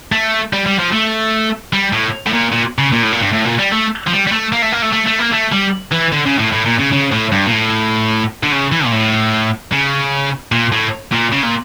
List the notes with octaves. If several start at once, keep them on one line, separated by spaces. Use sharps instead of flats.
A3
G3
G3
F3
A3
G3
A2
A2
A#2
A#2
C#3
A#2
A2
A#2
G2
A2
A#2
G3
A3
F3
G3
G3
A3
A#3
A3
A#3
A3
A3
A3
A#3
A3
G3
E3
D3
C#3
A2
A2
A#2
C#3
C#3
A2
G2
A#2
A2
D3
C#3
E3
A#2
A2
C#3
A#2
A2
A#2
C#3
A#2